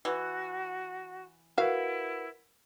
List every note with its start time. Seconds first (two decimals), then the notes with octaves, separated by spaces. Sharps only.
0.05 E3 F#4
1.58 E4 F#4 A#4 B4 F5 F#5